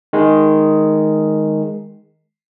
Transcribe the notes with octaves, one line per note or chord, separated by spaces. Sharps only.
D#3 G#3